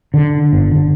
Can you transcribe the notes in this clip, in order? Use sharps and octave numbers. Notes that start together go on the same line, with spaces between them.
D3
G1
D3